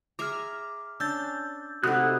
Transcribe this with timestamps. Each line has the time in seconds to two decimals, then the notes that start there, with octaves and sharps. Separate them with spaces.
0.19 G#4 E5 A#5 D6 F6
1.00 C#4 D4 E6 G6 A6
1.84 C3 A3 D#4 E4 F#4 D#6 F#6